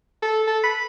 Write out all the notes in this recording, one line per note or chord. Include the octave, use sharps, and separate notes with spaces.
A4
A4
B5